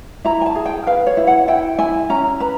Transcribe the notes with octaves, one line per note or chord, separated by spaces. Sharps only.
E4 A#5
G#5
A5
G#4
G5
B4 F5
C#5
E4
F#5
E4 G5
E4 G#5
C#4 A#5
B4 A#5